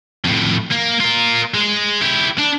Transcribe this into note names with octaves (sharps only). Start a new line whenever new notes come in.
F2 A2
A#3
F4 A#4
G#3
E4 G4
D4